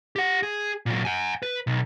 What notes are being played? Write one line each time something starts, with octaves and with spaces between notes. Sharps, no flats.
G4 F#5
G#4
A#2 F#3
F#5 G#5
B4
B1